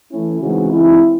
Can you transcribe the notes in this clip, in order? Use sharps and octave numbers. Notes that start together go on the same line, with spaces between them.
E3 A3 C#4 E4
C#3 E3 G#3 C4 D#4 F#4
E3 G#3 C4 D#4 E4